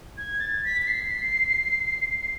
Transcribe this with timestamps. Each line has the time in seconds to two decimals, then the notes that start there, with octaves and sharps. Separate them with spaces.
0.18 G#6
0.40 A6
0.65 B6
0.82 B6
0.87 C7